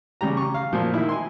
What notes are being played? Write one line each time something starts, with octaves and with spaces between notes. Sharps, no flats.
C#3 G3 G4 A#5
C#6
F5
A#2 F3
D#3 E4
G#5 C6